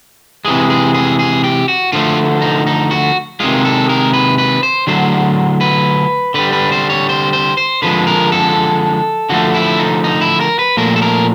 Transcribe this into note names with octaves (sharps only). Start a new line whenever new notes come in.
C3 E3 G#3 G#4
G#4
G#4
G#4
G4
F#4
D3 F3 A3 F4
D#4
D#4
F#4
C3 D#3 G#3 F4
A4
A#4
B4
B4
C5
D3 F#3 A3 C5
B4
D3 G3 B4
B4
C5
C#5
C5
C5
C5
D3 F3 G#3 B4
A#4
A4
D3 F3 A3 F#4
E4
D#4
D#4
E4
A#4
B4
A#2 F3 A3 A#4
A4
A#4